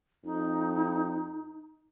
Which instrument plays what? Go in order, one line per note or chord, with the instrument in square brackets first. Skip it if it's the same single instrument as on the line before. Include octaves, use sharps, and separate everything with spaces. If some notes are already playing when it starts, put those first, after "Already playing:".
[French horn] F2 [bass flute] D#4